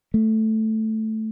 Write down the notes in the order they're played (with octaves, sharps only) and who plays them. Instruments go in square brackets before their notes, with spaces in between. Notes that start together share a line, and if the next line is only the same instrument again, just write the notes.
[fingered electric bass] A3